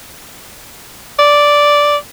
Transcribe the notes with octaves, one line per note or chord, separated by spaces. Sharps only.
D5